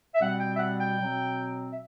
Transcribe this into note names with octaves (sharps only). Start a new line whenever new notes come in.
E5
B2 G3 C4 F#5
G5
E5
F#5
G5
B2 F#3 C4
E5